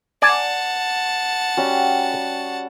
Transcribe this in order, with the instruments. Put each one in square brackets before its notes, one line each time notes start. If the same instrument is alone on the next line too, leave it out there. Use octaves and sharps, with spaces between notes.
[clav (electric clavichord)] D5 G#5 [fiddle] F#5 A5
[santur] G3 C#4 F#4